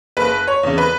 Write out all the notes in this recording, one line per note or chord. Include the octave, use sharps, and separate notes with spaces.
F#1 B4
C#5
E2 C#3
B4